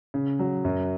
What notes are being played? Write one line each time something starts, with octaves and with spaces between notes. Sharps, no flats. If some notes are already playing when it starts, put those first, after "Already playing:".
C#3
F#3
F#2